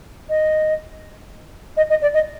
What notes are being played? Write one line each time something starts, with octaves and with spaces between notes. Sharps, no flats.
D#5
D#5
D#5
D5
D#5